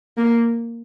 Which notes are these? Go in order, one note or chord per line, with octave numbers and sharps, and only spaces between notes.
A#3